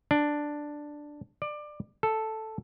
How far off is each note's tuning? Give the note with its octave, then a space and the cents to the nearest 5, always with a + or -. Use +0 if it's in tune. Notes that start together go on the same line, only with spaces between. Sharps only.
D4 +5
D5 +20
A4 +0